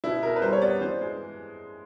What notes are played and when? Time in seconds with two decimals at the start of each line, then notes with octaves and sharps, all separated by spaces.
0.04 B2 E4
0.22 B2 A#4
0.36 B4
0.42 G3 C5
0.53 C#5
0.62 B3 D5
0.81 E3 C5
1.01 G#3